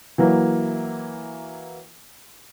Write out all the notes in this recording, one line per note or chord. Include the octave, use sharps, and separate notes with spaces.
E3 F#3 A#3